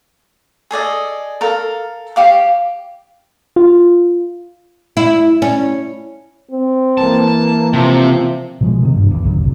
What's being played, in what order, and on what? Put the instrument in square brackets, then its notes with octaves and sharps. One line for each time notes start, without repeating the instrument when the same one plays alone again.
[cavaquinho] G#4 A4 D5 D#5
A4 A#4 F5
G4 F5 D6
[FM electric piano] F4
[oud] E4
C#4
[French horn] C4
[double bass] E3 A#3 [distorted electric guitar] A5
[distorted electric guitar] C3 [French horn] F3
[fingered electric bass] B2 F3 G#3
C3 D#3
E1 G2 D4
E2
G#1 C#2 D3 F#3
A1 C3